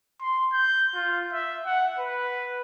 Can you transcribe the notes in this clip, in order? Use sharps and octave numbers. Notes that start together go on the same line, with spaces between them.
C6
G6
F4
E5
F#5
B4